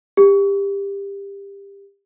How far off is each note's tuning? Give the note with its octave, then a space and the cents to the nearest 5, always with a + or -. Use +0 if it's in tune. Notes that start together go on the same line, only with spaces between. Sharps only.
G4 +25